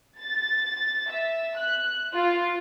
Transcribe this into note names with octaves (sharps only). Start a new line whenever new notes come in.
A6
E5
F#6
F4